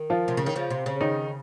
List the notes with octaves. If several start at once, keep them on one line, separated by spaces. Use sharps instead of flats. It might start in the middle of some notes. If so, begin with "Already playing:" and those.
Already playing: D#3
F3 F4
C3
C#3
D#3
C#3 F3
C3
C#3
D#3 D#4